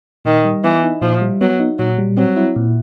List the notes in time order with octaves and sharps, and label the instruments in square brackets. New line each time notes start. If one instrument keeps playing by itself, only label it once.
[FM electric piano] A#2 [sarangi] D#3
[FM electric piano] G3
[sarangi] E3 [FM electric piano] B3
[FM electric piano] D#4
[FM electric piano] A#2 [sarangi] F3
[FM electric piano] G3
[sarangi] F#3 [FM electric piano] B3
[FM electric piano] D#4
[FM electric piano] A#2 [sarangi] F#3
[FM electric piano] G3
[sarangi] F#3 [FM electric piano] C4
[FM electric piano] E4
A#2